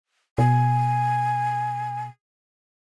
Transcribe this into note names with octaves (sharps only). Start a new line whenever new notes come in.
B2 G#5